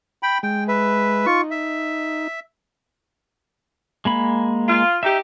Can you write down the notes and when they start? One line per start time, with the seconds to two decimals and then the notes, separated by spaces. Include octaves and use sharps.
0.23 G5 B5
0.43 G#3 G5
0.68 B4 E5
1.26 D#4 F4 C#6
1.51 E5
4.05 G#3 A#3 B5
4.68 F4
5.03 D#4 G4 E5